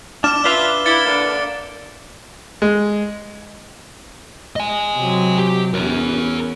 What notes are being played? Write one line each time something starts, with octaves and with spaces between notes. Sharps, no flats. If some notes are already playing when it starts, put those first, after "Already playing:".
D4 D6 F6 E7
D4 F4 B4 E5 F5 G7
E4 A6 C#7 G7
D3 A#3 D5
G#3
D#5 G#5
C3 F#3
G4
E2 C#4 A#4 C#5